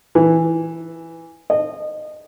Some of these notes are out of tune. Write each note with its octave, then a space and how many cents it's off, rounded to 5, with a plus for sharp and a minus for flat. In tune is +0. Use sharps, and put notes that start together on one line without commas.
E3 +0
D#5 -25